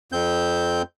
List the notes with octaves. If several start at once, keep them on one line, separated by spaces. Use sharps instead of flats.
F2 C4 G6